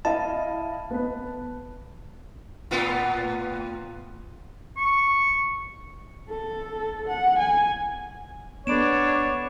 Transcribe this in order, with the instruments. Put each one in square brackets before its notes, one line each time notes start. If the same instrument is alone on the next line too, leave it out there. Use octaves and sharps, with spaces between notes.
[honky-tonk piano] E4 D#5 F5 [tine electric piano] A5
[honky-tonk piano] B3 B4
[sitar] A2 B3 F4
[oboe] C#6
[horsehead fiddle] A4
F#5
G#5
[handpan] B3 A4 [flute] D4 [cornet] C#5 [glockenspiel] B5 D7 E7